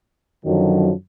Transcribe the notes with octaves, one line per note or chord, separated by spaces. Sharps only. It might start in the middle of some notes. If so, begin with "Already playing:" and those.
F#2 D3 D#3 F3 F#3